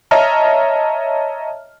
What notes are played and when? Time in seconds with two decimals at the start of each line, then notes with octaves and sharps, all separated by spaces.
0.11 C#5 D#5 E5 A5 A#5 F6